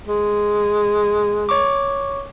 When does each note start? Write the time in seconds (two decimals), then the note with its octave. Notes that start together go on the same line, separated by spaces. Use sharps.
0.07 G#3
1.49 C#5 C#6 D6